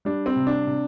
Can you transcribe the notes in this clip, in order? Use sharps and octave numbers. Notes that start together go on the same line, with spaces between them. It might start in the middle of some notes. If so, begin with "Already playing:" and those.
G3 D4
C4
C3
D4
C3